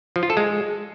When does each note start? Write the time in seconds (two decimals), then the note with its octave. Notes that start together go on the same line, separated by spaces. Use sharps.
0.16 F3
0.23 F4
0.30 A4
0.37 G#3